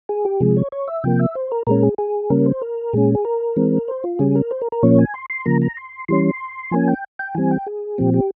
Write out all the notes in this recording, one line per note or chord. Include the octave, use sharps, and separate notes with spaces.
G#4
G4
C3 F3 G#3 G#4
C#5
C#5
E5
C3 F3 A#3 G5
E5
C5
A#4
A#2 G#3 C#4 A#4
G#4
G#4
C#3 G3 A#3 C#4 A#4
C5
A#4
A#2 G#3 C#4 G#4
G#4
A#4
E3 G#3 C4
C5
F4
C#3 G3 C#4 G#4
A#4
C5
A#4
A#4
A#2 F3 A#3 C#4 C#5
G#5
C6
C6
C#3 F3 A#3 A#5
A#5
C6
E3 G3 C#4 C6
F3 A#3 C#4 G#5
G5
G5
E3 G3 C4 G#5
G5
G#4
A#2 F3 C4 G4
G4